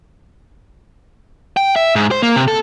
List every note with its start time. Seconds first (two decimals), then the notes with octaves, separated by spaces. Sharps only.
1.57 G5
1.76 E5
1.95 G#2
2.11 C5
2.23 A#3
2.36 C3
2.48 A4